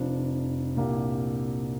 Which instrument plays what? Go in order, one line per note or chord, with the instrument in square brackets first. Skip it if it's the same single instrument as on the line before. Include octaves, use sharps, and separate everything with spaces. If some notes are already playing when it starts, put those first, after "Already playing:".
Already playing: [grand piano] F1 F2 F3 D4
C2 A#2 A#3 D4 G4